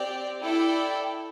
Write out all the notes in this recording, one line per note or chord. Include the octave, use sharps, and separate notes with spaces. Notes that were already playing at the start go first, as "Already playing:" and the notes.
Already playing: C4 G4 D5
E4 A4 D5 G5